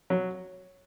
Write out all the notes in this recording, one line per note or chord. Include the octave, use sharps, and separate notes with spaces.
F#3